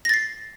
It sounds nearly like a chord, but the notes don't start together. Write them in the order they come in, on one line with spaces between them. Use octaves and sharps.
A#6 A6 C7